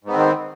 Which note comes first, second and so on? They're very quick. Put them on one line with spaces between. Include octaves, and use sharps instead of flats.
G#2 B3 C4 D#3